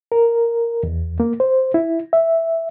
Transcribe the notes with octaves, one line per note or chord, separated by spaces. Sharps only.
A#4
E2
A#3
C5
E4
E5